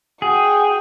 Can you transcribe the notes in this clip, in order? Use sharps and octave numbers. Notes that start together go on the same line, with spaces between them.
F#4 G#4 G5